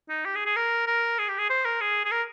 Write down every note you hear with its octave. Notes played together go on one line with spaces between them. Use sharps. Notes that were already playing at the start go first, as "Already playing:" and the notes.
D#4
G4
G#4
G#4
A#4
A#4
G#4
G4
G#4
C5
A#4
G#4
G#4
A#4